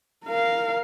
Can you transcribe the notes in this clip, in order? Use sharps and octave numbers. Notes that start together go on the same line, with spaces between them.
A#4 F5